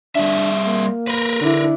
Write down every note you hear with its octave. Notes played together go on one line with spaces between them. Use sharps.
G3 D4 G#4 E5
A#3
A#4 B4
D3 D4 E4